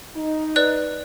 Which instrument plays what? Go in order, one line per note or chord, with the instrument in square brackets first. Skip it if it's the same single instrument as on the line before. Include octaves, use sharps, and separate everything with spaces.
[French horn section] D#4
[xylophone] B4 D5 F#6